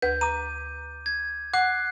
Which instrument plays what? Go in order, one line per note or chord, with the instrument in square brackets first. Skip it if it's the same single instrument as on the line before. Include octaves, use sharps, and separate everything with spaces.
[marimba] D2 B4 [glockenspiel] G6
[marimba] A#5 [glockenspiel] D6 D#7
[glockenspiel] G#6
[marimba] F#5 [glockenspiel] D6 F#6 C7